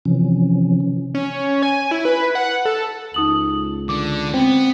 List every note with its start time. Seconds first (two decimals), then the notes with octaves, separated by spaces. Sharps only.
0.05 C3 E3 F3 C#4
1.14 C#4
1.63 G#5
1.91 E4
2.05 B4
2.35 F#5
2.65 A4
3.14 C#2 D#4 D#6 F#7
3.89 D3 D6
4.34 B3 C4